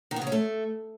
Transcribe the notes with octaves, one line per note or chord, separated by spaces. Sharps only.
D#3
B3
C#3
C#4
A3